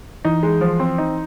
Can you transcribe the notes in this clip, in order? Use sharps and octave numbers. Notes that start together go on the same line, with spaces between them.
E3 D#4
G#3
F3
C4
D#4